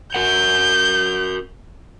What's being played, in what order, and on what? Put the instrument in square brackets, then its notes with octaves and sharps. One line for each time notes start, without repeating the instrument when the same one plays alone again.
[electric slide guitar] F#4 A#4 F#5 [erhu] G6